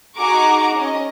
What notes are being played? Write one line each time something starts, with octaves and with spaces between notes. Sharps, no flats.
D#4 F#4 G#4 A#5 C#6 D6
C#4 D#5